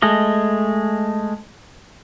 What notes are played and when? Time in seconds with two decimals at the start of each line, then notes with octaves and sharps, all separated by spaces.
0.02 G#3 A3 D#5